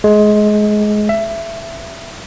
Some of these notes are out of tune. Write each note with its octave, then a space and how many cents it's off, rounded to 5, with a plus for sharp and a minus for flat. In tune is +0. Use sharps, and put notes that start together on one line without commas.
G#3 +20
E5 +15